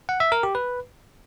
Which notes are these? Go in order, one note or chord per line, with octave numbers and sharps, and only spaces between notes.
F#5
E5
A#4
G4
B4